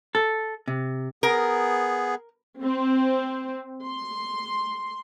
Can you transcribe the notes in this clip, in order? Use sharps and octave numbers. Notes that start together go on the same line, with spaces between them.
A4
C3
B3 G#4 A#4
C4
C6